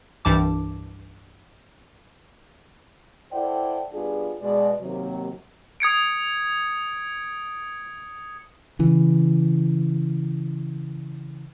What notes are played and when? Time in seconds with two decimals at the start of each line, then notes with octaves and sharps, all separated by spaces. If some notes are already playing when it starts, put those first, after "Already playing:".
0.25 C2 G2 E3 A5 D6
3.33 E4 A4 C5 D5 F#5 G5
3.93 G3 B3 D4 F4 G#4
4.42 B2 G#3 D5
4.81 D#2 C3 F#3
5.80 D#6 G#6 C#7 D7
8.79 C#3 E3